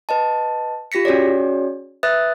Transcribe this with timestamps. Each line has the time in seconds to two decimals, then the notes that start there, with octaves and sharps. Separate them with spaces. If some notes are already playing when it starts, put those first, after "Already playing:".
0.09 B4 D#5 A5
0.92 F4 G4 A#6 B6 C#7
1.05 C#4 F#4 G#4 C#5 D5
2.03 B4 E5 D#6 F#6 A6